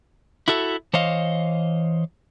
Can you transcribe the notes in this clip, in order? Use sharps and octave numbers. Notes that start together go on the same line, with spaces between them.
E4 F#4 A4 E5
E3 C5 C#5 D#5 F5